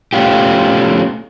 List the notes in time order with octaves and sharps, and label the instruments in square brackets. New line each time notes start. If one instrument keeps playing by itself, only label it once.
[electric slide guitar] A3 B3 C#4 F4 G4